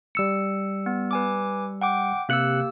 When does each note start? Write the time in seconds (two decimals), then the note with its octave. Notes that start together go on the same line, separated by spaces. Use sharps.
0.15 G3 E6 C#7
0.86 B3
1.11 B4 G#5 D6
1.81 F#5 G5 D6
2.29 C3 A#3 G4 E6 F#6 C#7